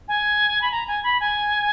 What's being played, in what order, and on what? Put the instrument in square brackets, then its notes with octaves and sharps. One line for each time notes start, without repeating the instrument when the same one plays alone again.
[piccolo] G#5
B5
A#5
G#5
B5
G#5